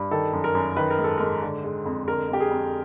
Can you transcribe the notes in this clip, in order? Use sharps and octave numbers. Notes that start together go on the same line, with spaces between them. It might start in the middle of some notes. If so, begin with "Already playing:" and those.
Already playing: G2
D#3 A4
F#2
A#4
F#2
D#3 B4
A#4
G#2
A4
G#2 A#4
D3
G#3
F2
D3 A#4
F2 G4
G#4
F2